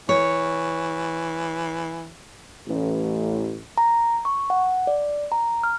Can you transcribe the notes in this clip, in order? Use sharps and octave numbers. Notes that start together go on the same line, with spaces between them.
E3 C#5
A1
A#5
C#6
F#5
D5
A#5
F6